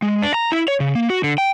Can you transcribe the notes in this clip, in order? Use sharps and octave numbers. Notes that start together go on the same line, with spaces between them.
G#3
D4
A#5
E4
C#5
C#3
A#3
F#4
D3
G5